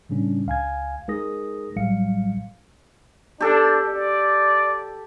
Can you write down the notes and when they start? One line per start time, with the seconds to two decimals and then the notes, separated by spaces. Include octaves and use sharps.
0.09 A2 C#3 G3 C#4 D4
0.46 C#2 F5 G#5 G#6
1.08 G#3 D#4 G#4 A#4 D#6 A#6
1.76 A#1 A2 F#3 G3 F5 C#7
3.40 D4 G4 A4
3.88 D5